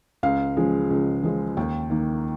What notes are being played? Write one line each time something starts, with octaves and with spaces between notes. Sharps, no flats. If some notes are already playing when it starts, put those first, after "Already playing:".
C#2 F5
C#3 F3 G#3
C#2
C#3 F3 G#3
D#2 G5
D#3 A#3